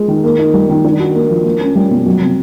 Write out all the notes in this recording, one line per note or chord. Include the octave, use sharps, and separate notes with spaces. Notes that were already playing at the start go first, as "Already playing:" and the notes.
Already playing: G#3
D#3
A#3
D#4
G3
D#3
D4
F#4
A#3
F3
A#3
C#4
G3
B2
F#3
C3